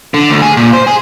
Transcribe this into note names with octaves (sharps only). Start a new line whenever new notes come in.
D3
D2
G#4
A#2
C5
G#4